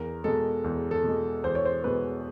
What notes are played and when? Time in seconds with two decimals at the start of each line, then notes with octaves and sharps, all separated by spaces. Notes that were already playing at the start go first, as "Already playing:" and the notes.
Already playing: E2 A#4
0.24 B2 G#3 A4
0.64 E2
0.91 A4
1.04 B2 G#3
1.44 E2 C5
1.55 C#5
1.65 C5
1.84 B2 G#3 B4